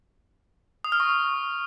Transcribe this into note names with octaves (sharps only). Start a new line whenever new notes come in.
D#6
F6
C#6